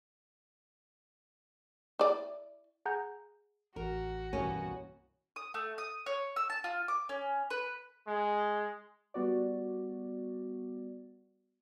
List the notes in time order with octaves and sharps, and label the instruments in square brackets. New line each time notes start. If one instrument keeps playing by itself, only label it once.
[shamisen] E4 D5
[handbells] G#4 F#5 G#5 A#5 G6
[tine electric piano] A1 [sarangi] F#4 [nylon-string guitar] A#4
[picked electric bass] C2 G2 E3 [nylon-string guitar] B2 A#3 C#4
[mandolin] D#6
A3
D#6
C#5
E6
A5
F4
D6
C#4
B4
[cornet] G#3
[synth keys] G3 B3 F#4 D5